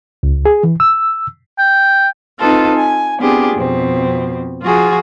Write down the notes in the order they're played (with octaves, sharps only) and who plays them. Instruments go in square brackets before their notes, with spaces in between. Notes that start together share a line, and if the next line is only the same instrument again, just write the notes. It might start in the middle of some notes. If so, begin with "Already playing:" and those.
[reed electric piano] C#2
G#4
E3
E6
[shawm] G5
[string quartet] C4 D#4 F4 A4 B4
G#5
B3 C4 D4 F4 G4 G#4
F2 B2 C4
F3 F4 F#4 G#4